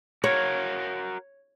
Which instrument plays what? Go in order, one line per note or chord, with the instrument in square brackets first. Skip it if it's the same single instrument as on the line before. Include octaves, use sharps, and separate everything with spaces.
[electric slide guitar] F#4 A#4 F5 [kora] C#5